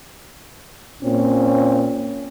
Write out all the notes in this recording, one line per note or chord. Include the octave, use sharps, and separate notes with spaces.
A#2 C4 C#4